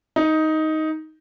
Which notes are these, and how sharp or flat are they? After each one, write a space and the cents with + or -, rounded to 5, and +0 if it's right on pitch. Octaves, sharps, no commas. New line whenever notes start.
D#4 +10